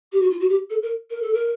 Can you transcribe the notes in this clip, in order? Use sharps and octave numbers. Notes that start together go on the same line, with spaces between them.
G4
F#4
F4
F#4
G4
A4
A#4
A#4
A4
A#4